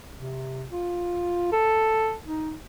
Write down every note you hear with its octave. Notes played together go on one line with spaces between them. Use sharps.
C3
F4
A4
D#4